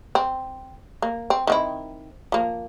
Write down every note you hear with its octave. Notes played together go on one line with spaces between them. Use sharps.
C4
A#3
C4
D#3 C4 E4
F3 A#3